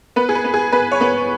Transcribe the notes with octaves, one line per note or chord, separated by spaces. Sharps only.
B3 B4
G#4
B4
B3
G#4
B3 B4
C#5
B3